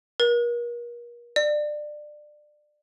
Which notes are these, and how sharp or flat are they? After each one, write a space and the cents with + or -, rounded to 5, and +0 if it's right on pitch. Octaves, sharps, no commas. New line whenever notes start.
A#4 +35
D5 +25